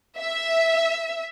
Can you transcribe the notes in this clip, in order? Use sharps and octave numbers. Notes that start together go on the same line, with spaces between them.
E5